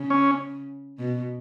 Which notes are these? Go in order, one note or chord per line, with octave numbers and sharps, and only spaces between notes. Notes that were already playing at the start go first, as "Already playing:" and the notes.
Already playing: C#3
C#4
B2